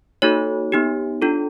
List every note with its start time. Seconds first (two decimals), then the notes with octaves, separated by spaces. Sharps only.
0.22 A#3 D#4 F#4 A4 C#5
0.72 B3 D#4 G4
1.22 D4 F4 A4